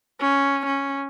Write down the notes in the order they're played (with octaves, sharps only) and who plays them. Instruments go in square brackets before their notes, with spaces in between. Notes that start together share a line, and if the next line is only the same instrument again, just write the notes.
[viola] C#4
C#4